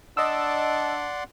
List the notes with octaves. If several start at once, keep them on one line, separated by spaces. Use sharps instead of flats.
D4 D5 D#5 F#5 C6 E6